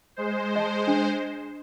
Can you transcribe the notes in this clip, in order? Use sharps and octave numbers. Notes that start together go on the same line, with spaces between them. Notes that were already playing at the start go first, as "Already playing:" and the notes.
G#3 C5
D#5 A5
D4